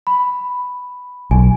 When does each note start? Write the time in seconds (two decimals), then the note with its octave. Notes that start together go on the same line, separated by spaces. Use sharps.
0.07 B5
1.31 B1 G#5